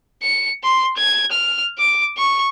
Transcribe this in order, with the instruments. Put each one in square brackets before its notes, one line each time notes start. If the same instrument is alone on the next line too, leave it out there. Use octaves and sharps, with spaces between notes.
[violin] C#7
C6
G#6
F6
D6
C#6